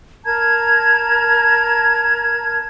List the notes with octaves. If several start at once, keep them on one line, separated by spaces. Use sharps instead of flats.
A#4 A5 A#5 G#6